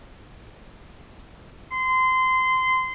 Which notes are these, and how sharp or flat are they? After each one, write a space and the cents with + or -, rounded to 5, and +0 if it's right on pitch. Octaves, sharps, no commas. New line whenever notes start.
C6 -20